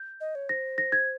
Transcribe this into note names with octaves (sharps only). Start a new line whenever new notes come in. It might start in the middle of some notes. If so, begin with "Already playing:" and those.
Already playing: G6
D#5
C#5
C5 A#6
A#6
G#6